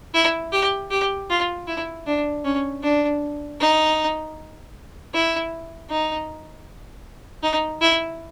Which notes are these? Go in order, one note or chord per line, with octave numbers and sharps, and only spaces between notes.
E4
G4
G4
F4
E4
D4
C#4
D4
D#4
E4
D#4
D#4
E4